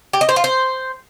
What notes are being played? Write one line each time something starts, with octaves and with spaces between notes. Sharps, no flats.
G4
D#5
C5
F4
C5